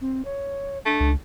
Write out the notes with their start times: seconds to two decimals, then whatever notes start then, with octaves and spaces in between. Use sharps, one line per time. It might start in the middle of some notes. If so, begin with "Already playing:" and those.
0.01 C4
0.25 C#5
0.86 A3 D4
1.00 C#2